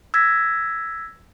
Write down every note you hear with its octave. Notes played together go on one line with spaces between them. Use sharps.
E6 G#6 A#6 B6